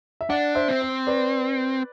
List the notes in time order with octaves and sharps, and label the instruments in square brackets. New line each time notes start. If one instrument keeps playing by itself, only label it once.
[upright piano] E5
[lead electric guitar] D4 [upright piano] D5 F#5
[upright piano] C5 E5
[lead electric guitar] C4
[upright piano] C5
B4 D5